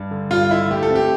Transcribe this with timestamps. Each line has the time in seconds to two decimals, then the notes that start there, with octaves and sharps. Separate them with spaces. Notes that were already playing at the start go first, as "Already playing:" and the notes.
Already playing: G2
0.11 D3
0.31 G2 F4
0.51 D3 E4
0.71 A3 G4
0.83 A4
0.90 C4 G4